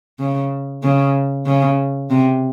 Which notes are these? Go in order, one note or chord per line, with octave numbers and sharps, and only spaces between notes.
C#3
C#3
C#3
C3